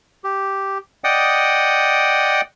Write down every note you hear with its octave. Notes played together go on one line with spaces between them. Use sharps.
G4
D5 D#5 F#5 G5 D#6